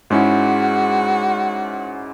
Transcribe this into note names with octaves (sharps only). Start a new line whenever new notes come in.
G#2 G#3 C#4 E4 F#4